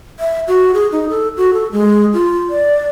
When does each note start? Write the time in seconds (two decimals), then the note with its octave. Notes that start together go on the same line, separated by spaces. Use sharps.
0.20 E5
0.48 F#4
0.74 G#4
0.92 D#4
1.10 A4
1.37 F#4
1.53 A4
1.72 G#3
2.13 F4
2.50 D5